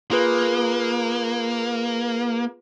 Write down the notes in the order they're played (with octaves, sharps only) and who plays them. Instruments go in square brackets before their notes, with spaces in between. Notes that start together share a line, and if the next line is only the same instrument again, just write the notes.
[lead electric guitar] A#3 [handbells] F4 G#4 B4